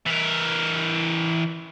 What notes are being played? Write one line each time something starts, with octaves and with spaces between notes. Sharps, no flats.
E3 A#4